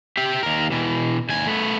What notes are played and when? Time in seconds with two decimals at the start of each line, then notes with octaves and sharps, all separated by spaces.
0.17 G4 E5
0.43 D#2 A#4
0.72 B2 E3
1.29 D#2 G#5
1.47 A3 B3